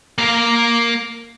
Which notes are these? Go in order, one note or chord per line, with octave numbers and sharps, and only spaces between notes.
A#3 F5